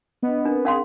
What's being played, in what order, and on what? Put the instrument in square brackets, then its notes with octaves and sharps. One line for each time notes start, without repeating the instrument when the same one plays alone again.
[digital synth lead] B3 [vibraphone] D4 D#5
[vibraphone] C4 A#4 [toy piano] D4
[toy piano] C#4 F5 C6 [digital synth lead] G#4